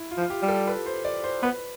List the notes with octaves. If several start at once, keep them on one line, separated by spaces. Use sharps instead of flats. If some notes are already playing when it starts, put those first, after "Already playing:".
Already playing: E4
F4
F3
F4
G4
G3
A4
B4
C5
D5
C5
B3 B4